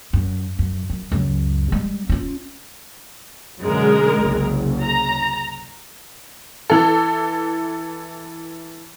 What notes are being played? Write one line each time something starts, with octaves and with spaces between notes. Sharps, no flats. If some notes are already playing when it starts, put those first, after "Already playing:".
F#2
F#2
F#2
C#2 F#2
G3 G#3
C#4 F4
F#2 B2 D3 G#3 A#4
F#1 C2 C#3
A#5
E3 A4